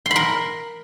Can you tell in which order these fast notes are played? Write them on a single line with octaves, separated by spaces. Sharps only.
C6 B5 A#4